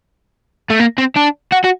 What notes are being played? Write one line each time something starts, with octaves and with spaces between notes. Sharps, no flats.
A3
A#3
C4
D4
F#4
F#4